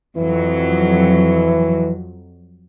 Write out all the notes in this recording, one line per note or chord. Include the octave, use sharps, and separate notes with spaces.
F2 E3 F#3